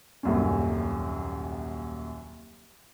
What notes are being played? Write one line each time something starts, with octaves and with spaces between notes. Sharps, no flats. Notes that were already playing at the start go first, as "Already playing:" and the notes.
D#1 C2 F#2 A#2 C#4